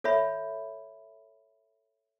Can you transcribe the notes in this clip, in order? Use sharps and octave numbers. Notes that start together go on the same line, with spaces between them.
A4 C#5 E5 B5